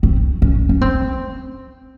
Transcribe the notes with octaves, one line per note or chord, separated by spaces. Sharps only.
C4
C#4
C#4
C4